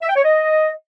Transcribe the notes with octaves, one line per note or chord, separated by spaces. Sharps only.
E5
G5
C#5
D#5